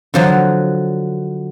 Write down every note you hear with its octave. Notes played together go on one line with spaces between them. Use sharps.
D3 F3 F#3